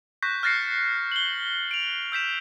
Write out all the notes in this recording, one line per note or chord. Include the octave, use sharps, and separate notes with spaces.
C#6 F#6 G6 A#6 B6
F6 F#6 A6 A#6 C7 C#7
F#7 G7
D7 F7
E6 G6 B6 E7